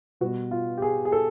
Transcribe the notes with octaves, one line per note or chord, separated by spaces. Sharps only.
B2 G3 B3 F#4
F4
G4
G#4
G#4
A4